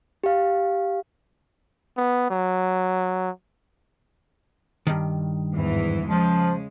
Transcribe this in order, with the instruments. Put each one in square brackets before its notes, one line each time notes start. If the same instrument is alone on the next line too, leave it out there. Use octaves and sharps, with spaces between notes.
[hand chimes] G4 F5
[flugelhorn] B3
F#3
[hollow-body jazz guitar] G2 D#3
[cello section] E2 G#2 E3
[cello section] C#3 G#3 [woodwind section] F3